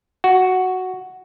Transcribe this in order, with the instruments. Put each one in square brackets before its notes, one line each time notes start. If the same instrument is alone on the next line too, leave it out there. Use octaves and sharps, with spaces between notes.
[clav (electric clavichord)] F#4